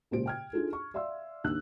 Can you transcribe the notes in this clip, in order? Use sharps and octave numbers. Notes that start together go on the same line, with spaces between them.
C#2 A#2 G4 C5 D7
G5 F6 G#6
D4 D#4 F4 G#4 A4
C#6
D5 E5 F5 C6 E6
D#2 D4 E6 F#6